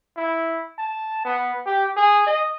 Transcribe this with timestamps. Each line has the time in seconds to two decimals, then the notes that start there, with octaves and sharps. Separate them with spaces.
0.17 E4
0.78 A5
1.25 B3
1.66 G4
1.96 G#4
2.26 D#5